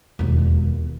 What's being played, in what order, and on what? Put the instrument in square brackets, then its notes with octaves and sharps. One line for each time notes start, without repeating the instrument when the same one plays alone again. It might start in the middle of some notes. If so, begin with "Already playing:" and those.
[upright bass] E1 D#2